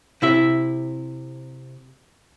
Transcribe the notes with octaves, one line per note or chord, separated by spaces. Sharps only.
C3 E4 E5